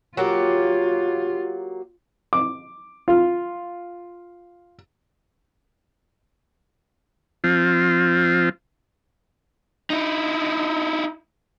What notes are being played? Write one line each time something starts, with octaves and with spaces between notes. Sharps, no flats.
F#3 A#3 F4 G4
D6
F4
F3 C4 F4
D#4 E4